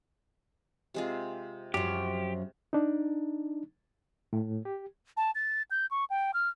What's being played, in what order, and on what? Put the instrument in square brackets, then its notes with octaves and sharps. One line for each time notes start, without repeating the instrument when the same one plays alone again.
[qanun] C3 G#3 F4
[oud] F#2 F3 [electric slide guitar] G4
[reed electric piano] D4 D#4
A2
G4
[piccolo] A5
A6
G6
C#6
G5
F6